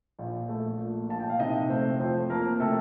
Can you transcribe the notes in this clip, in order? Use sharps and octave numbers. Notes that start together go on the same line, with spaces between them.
A#1
A3
A#2
A#1 A5
G5
F5
C3 D#4 D#5
A3 C4 C5
F2 C4 C5
F3 A#3 A#4
C3 A3 A4